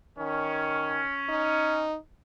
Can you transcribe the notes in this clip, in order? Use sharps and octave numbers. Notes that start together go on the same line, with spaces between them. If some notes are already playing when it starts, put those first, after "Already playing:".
D#3 C#4
D#4